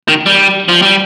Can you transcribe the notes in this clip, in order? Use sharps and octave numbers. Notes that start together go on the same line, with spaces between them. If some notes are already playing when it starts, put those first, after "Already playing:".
D#3
G3
F3
G3